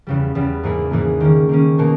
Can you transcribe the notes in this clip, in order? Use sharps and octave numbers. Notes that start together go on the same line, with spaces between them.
E2 C#3 G3
E2 C#3 G3
G#2 E3 A#3 E4 G#4
G#2 E3 A#3 E4 G#4
D#3 A#3 C#4
D#3 A#3 C#4
B2 A#3 D#4 A#4